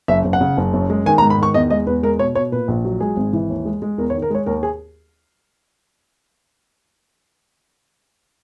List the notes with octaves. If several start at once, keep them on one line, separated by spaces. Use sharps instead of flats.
F#1 E5
F#1
F#5
C#3
F#1
F#2
G#3
D#3 G#5
A#5
G#2
B5
D#3 C#6
E2 D#5
G#3 D#5
E2 B4
G#3 A#4
B2 C#5
B2 C#5
A#2 B4
A#1
F#3
G#3 G#4
G#1
E3
D#2
G#3
G#3
E2 A#4
C#5
D#3
A#4
G#3 C#5
D#2 A#4
G#4